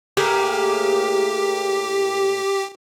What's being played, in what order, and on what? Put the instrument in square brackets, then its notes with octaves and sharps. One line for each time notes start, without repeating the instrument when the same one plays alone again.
[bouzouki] A2 A#3 G#4 [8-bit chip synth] G4